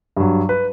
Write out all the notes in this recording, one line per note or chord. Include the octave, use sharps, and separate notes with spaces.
G2 F#3
B4